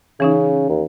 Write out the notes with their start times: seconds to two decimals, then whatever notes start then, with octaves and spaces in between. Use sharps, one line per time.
0.20 C#3 E3 C#4 D#4
0.69 D#2